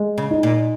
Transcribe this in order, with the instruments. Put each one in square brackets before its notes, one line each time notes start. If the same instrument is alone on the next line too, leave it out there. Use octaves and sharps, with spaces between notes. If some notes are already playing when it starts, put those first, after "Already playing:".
Already playing: [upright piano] G#3
[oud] C#3
[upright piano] D#4
[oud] A#2